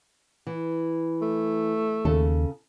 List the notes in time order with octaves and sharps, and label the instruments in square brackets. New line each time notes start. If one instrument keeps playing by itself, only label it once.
[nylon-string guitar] E3
[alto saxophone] A3
[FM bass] D#2 [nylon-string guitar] C#3 A4